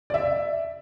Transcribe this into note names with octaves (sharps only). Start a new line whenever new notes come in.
D5
E5